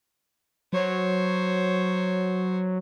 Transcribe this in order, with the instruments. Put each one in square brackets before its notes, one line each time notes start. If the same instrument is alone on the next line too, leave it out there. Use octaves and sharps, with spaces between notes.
[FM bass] F#3 [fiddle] C5 C#5